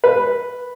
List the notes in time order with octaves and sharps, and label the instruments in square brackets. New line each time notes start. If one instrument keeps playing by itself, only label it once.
[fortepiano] B4